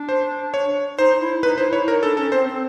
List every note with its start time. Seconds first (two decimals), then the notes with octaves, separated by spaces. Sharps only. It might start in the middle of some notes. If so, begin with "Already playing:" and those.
Already playing: D4
0.09 C5
0.54 C#5
0.98 D#4 C5
1.20 E4
1.43 D#4 B4
1.58 E4 C5
1.73 E4 C#5
1.88 D#4 A#4
2.03 D4 A4
2.17 C#4 A4
2.32 C4 C5
2.47 C4